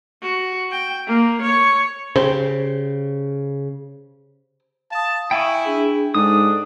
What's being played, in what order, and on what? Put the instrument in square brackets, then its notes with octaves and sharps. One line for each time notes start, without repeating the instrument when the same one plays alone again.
[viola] F#4
G5
A#3
C#5
[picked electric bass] C#3 [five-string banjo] G4 C5
[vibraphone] F5 D#6 [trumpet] A5
[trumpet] E4 [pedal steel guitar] G5 G#5 C#6
[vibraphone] D4 G#4
[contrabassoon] G#2 [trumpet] D4 [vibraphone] A4 [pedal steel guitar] D#6